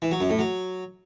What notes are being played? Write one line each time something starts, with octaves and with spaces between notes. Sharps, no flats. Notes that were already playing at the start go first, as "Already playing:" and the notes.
E3
F#3
F#2
A2
F#3